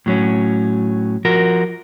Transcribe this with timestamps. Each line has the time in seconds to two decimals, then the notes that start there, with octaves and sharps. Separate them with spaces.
0.06 A2 F#3 C#4
1.25 F3 F#4 A#4